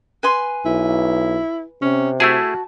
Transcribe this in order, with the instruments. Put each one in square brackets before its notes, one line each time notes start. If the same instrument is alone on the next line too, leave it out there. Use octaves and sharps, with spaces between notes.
[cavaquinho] B4 G#5 C6
[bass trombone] B1 [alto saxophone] E4
[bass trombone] C3 [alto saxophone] C#4
[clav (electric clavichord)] A3 E4 G#4 [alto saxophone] F#4 [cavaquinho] A5